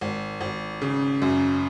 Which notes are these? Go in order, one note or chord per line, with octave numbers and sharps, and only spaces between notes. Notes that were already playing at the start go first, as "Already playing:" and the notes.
G#1
G#1
C#3
F#2